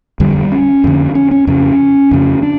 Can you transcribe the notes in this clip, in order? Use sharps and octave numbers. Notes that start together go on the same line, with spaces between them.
F2 D3 G3
C#4
F2 D3
C#4
C#4
F2 C#3 C#4
F2 C#3
D4